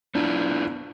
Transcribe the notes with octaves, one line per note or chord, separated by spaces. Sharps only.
B3 D4 E4 F4